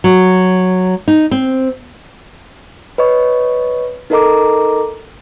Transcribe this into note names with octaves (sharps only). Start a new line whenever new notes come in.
F#3
D#4
C4
B4 C#5 D#5 C#6
D#4 A4 A#4 D#5 A#5 D6